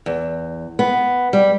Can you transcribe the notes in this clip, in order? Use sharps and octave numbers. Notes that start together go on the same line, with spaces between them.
E2
B3
G3